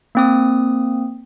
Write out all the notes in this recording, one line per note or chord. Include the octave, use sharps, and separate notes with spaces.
A#3 C4 D#6